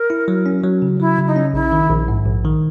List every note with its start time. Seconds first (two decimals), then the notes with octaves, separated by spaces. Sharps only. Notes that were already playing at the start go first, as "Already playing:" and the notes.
Already playing: A#4
0.10 E4
0.28 F#3
0.46 C#4
0.64 F#3
0.82 C#3
1.00 F#3 E4
1.18 C#3
1.27 D#4
1.36 C#4
1.54 A#1 E4
1.72 D#3
1.90 A#1
2.08 G#2
2.26 A#1
2.45 D#3